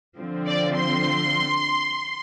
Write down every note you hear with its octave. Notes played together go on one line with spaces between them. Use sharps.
D3 F3 C4
D5
C6